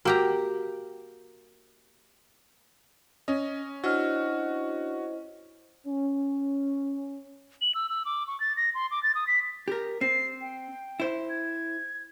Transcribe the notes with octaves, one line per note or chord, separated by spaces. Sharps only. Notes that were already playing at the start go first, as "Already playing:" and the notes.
A#3 F#4 G4 A#4 F#5 A#5
C#4 D#5
D4 E4 F#4 C5 D#5 F6
C#4
F#7
E6
E6
D6
C#6
A6
A#6
C6
D6
A6
D#6
B6
G4 A#4
C4 C7
G5
E4 C5
G#6